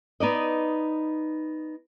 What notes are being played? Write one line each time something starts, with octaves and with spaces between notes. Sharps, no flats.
B3 D#4 D5 D#5